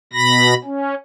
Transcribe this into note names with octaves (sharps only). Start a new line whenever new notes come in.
B2 B5 A#6
C#4